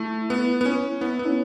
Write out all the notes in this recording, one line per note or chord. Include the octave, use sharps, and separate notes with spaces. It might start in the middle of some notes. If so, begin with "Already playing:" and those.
Already playing: A3 E4
B3
B3
C#4
B3 E4
B3
C#4